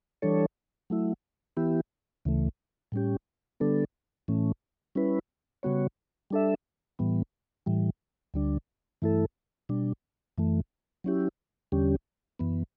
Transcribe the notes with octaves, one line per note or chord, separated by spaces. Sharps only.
E3 G3 D4 A4 C#5
F#3 A3 E4
E3 B3 E4 G4
D2 C#3 E3 A3
A2 G3 C#4 G4
D3 G3 B3 D4 A4
A2 E3 A3 C#4
G3 C#4 E4 B4
C#3 G3 B3 F#4 C#5
G3 D4 A4 E5
A2 E3 G3 B3
A2 E3 G3
D2 D3 G3 D4
G2 E3 A3 E4 A4
B2 G3 D4
F#2 E3 A3
F#3 C#4 E4 G4
E2 D3 G3 C#4 G4
F#2 E3 B3